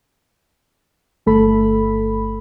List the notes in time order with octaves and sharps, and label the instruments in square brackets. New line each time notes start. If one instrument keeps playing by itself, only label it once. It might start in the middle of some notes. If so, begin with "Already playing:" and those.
[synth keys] G1 A3 A4 B5